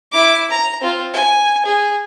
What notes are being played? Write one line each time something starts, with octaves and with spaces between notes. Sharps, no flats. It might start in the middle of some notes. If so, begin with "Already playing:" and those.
E4 D6
A#5
C4 F4
G#5
G#4